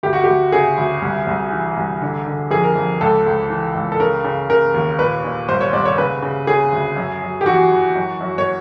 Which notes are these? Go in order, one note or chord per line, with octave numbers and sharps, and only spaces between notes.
D2 G4
F#4
D2 G4
C#3 G#4
D2
C2
C2
E3
C2
D3
D3
F2 G#4
A#4
F2
C#2 A4
C#2
E3
C#2
A4
C#3 A#4
C#3
C#3 A#4
D#2
A#2 B4
A#2
C2 C5
C#5
C2 D5
C#5
C#3 B4
C#3
C#3 G#4
D2
F#2
F#2
G4
E3 F#4
E3
F#2
F#2
C#5